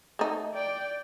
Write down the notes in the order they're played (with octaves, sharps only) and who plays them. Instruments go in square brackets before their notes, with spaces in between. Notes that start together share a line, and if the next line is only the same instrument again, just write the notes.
[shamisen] A3 D#4
[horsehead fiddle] D5 G5